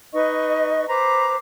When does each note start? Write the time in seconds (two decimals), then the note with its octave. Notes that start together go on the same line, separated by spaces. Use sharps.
0.13 D#4 B4 D#5 C#6
0.89 B4 C5 A#5 D6